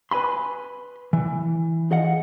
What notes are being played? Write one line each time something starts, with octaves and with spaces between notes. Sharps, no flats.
B4 G#5 B5 C6
E3
G#4 D#5 F5 F#5